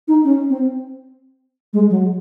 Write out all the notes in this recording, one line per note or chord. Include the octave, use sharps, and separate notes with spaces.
D#4
C#4
C4
G#3
F#3